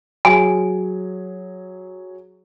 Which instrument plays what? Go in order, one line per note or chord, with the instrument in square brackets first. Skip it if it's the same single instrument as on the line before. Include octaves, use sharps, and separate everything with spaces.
[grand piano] F#3 G#4 [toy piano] G#5